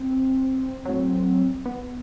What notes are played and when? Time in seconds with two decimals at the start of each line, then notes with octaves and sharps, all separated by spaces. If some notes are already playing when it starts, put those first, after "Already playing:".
Already playing: C4
0.85 A2 F#3
1.65 B3